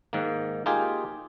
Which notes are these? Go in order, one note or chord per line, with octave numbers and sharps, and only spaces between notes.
G#2 D#3 A#3
A#3 D#4 F4 G4 G#4